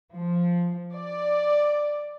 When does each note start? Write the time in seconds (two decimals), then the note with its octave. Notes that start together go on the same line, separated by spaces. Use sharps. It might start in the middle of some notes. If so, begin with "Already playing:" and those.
0.16 F3
0.95 D5